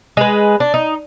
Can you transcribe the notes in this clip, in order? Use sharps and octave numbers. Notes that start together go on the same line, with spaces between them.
G#3 B4
D4
D#4